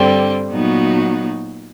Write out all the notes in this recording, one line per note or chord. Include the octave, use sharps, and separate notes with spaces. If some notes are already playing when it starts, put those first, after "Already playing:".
Already playing: G2 D3 G3 C4
A#2 F#3 B3 D#4 F#4